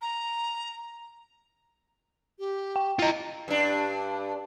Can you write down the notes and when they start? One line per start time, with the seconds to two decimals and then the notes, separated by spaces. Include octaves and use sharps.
0.01 A#5
2.39 G4
2.76 G5
2.99 E4 F4 D#5 A#5
3.48 G2 D4